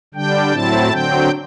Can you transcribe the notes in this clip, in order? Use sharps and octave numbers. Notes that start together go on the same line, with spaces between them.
D3 G3 D4 G5
A2 F#3 C4 E4 A5
D3 F#3 C4 G5